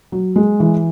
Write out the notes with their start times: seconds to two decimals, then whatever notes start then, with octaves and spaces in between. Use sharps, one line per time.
0.12 F#3
0.36 G#3
0.60 E3